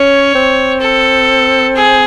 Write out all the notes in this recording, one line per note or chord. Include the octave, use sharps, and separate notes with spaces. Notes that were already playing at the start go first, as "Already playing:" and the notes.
Already playing: C#4 C#5
C4
A4
G#4